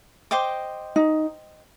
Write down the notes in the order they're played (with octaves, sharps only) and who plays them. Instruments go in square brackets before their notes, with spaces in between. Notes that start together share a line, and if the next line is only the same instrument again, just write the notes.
[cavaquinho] C5 D#5 G5 D6
[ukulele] D#4